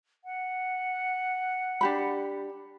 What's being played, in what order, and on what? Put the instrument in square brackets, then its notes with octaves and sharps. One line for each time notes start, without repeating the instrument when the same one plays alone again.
[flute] F#5
[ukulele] D4 G4 B5